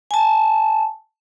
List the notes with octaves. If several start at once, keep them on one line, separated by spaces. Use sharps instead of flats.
G#5 A5